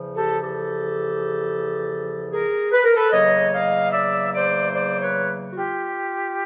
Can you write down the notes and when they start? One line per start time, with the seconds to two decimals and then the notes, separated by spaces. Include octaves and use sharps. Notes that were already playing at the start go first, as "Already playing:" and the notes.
Already playing: E2 C#3 F3
0.15 G4 A4
0.42 G4 A4
2.31 G#4 A#4
2.72 B4
2.84 A#4
2.96 A4 B4
3.12 E2 C#3 F#3 A#3 C#5 D#5
3.52 D#5 F5
3.93 D5 E5
4.34 C5 D5
4.74 C5 D5
5.01 B4 C#5
5.50 F#4
5.55 F4 G4